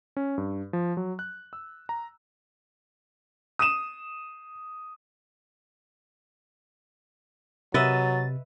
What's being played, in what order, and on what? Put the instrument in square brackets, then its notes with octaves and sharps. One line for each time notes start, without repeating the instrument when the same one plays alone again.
[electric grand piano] C#4
G2
F3
F#3
F#6
E6
A#5
[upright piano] D#6 D#7 E7
[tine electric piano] C3 [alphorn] F#3 [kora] B4 D#5 E5 [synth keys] A6